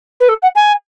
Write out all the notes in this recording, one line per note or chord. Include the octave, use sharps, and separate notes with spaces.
B4
A4
F#5
G#5